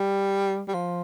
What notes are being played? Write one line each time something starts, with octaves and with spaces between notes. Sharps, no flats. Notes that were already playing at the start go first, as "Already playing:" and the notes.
Already playing: G3
G3
F3